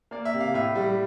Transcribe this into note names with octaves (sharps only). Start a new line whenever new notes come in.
A#3 D5
E5
C3
F5
A2 E5
G3